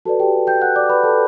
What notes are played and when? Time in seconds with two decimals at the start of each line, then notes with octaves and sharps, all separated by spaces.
0.05 F#4 A4 B4 D5 A5
0.20 G4 G5
0.47 G5 G6
0.61 F#5 F#6
0.76 D5 D6
0.89 B4 B5
1.03 A4 A5